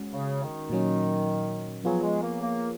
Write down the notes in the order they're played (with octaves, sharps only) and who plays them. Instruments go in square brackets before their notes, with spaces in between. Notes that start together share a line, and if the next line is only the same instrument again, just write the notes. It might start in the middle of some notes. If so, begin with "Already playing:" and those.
Already playing: [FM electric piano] G#3 C#4 F#4
[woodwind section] C#3
D#3
[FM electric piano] A#2 F#3 C#4
[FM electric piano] F3 B3 F4 G#4 C#5 [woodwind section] F#3
[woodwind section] G#3
A#3
A#3